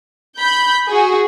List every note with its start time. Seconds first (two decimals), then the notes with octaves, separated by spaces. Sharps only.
0.39 B5 G6
0.88 F#4 G#4